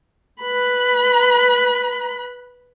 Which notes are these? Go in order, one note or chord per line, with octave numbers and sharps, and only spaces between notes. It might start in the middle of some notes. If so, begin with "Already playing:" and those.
B4 B5